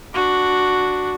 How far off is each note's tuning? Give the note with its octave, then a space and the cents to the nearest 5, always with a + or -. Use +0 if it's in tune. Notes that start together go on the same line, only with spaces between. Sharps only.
D4 +0 F#4 +0